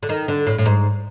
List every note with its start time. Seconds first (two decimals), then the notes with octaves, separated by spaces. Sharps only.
0.03 D3
0.09 D#3
0.28 D3
0.47 A2
0.58 A2
0.66 G#2